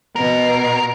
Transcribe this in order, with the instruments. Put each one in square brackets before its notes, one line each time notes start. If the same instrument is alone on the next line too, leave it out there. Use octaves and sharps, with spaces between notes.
[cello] B2 [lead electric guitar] A#4